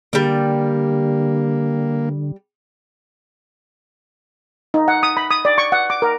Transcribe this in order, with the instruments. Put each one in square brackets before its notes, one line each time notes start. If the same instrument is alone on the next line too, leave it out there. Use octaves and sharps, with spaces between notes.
[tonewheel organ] D3 [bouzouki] G3 D5 [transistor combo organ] A#3
[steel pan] D#4
F#5
D#6
B5
D#6
D5
C#6
F#5
D6
A#4